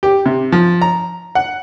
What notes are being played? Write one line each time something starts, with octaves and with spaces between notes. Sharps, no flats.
G4
C3
F3
A#5
F#5